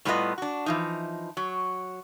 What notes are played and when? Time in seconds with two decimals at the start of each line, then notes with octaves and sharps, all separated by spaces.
0.05 A2 G3 B3 F4 B4 D#5
0.38 D4 F#4
0.66 E3 F3 D#4
1.37 F#3